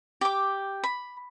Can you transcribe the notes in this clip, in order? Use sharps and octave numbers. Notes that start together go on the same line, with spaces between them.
G4 D6
B5